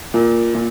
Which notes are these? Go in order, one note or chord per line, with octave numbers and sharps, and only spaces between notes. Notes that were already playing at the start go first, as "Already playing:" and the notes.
A#2
A#2